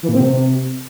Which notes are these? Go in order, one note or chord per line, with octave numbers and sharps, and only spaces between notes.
E3
A#2
C4
C3